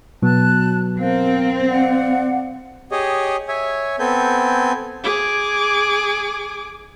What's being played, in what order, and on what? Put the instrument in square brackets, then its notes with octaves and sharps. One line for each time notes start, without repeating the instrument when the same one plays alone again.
[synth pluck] B2 F#3 B3 [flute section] A5 F#6
[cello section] C4 [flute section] A#4 F5
[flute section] D5 F5 F#5
[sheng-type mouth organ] G4 G#4 C#5 D#5
C#5 E5 G#5
B3 C4 A4 G#5 G6
[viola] G#4 D6